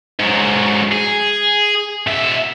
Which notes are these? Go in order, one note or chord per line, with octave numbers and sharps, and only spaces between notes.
G#2 F#3
G#4
B2 E5